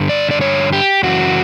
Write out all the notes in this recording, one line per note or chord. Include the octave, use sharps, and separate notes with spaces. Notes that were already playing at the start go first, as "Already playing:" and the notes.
Already playing: G2 D3
D5
D5
C#5
G4
F#2 C#3 E3 F#4